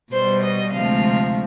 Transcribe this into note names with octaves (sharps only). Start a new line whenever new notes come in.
B2 G3 C5
D#5
D2 C3 F3 G#3 F5